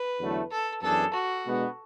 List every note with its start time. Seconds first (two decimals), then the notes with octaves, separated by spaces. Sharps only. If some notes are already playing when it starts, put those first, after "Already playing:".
Already playing: B4
0.20 E2 D3 F#3 A3 E4
0.51 A4
0.82 F#2 E3 B3 D4 G#4 A4
1.14 F#4
1.45 B2 G#3 B3 D4